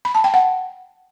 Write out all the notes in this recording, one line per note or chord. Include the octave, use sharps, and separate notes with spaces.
B5
A5
G5
F#5